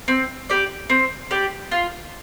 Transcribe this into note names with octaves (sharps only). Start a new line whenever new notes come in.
C4
G4 D5
C4
G4 D5
F4